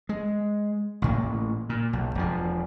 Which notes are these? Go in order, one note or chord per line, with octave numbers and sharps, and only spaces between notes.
G#3
A1 A2 A#3
A#2
B1
E1 F3